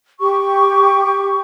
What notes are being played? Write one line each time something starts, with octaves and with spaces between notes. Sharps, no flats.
G4 C#6